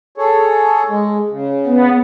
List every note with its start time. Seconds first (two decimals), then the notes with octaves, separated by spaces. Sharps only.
0.18 G#4 A4 C#5
0.89 G#3
1.30 C#3
1.66 B3